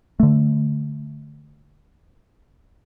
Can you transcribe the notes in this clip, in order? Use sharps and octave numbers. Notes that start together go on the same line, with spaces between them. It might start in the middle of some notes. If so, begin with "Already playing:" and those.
D3 A3